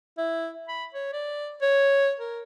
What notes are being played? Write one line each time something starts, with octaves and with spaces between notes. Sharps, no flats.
E4
B5
C#5
D5
C#5
A#4